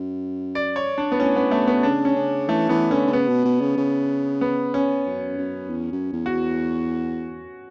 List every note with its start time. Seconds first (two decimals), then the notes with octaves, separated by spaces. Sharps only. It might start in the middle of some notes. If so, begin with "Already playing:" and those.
Already playing: F#2
0.55 D5
0.76 C#5
0.98 D4
1.12 B3
1.19 A2 C#4
1.36 B3
1.51 B2 A3
1.67 B3
1.83 C#3 D4
2.05 C#4
2.16 C#3
2.48 E3 A3
2.69 E3 B3
2.91 D3 C#4
3.07 D3
3.12 C#3 B3
3.29 B2
3.45 B2
3.61 C#3
3.77 C#3
4.41 B3
4.74 C#4
5.06 F#2
5.38 F#2
5.70 E2
5.92 F#2
6.13 E2
6.26 F#4